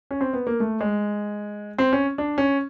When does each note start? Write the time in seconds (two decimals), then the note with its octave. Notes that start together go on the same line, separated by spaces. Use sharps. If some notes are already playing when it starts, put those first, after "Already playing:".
0.11 C#4
0.21 C4
0.34 B3
0.47 A#3
0.60 A3
0.81 G#3
1.78 C4
1.93 C#4
2.18 D4
2.38 C#4